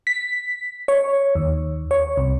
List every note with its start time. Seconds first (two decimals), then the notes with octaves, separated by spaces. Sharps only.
0.07 B6
0.88 C#5
1.35 D#2
1.91 C#5
2.17 C2